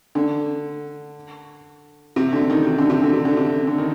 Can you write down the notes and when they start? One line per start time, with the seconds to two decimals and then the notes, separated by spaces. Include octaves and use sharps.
0.15 D3
2.16 C3
2.33 D3
2.50 D#3
2.67 C3
2.78 D3
2.90 C3
3.02 D3
3.13 C3
3.25 D3
3.37 C3
3.67 D3
3.78 D#3